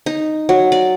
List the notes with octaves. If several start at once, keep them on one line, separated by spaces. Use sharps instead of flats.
D#4
F#3
D5